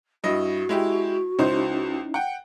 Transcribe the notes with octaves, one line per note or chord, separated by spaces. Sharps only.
G2 E4 F#4 D#5
G#3 E4 G4
C#2 C#4 D#4 E4 C5
F#5 G5